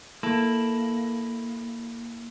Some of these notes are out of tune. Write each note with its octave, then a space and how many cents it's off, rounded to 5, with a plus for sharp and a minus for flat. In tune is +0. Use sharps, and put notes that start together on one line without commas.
A#3 +0 E4 +0 A4 +5